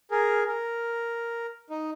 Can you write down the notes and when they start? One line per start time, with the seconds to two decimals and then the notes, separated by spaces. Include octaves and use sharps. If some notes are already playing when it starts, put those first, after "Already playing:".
0.11 G#4 A#4
0.48 A#4
1.70 D#4